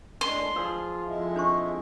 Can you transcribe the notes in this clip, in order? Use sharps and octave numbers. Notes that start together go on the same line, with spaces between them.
A2 G#3 D4 C6
F3 F4 G#4 B4 E6
F2 G#3 E4
D4 C5 C#6